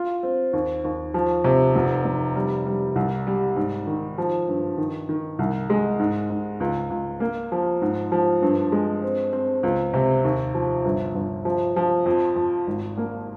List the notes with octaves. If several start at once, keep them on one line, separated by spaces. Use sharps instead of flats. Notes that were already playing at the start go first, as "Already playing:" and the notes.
Already playing: F4
C4
D#2
D#2
F3
C3
F1
F1
G3
G3
C2
G3
G#2
D#3
F3
G2
D#3
D#3
C2
G#3
G#2
G#2
C#2
C#2
A#3
F3
G#2
F3
G2
G#3
C4
C4
C#2
C3
D#2
F3
G1
G1
F3
F3
F2
F2
G#1
A#3